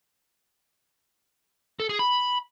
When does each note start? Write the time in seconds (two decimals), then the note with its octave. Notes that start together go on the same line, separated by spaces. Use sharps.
1.80 A4
1.89 G#4
1.99 B5